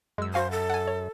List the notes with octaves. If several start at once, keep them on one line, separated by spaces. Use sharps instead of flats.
F#2 G#3 E6
F#4 C5 F5 G#5
A4
F#5 G#5
C#5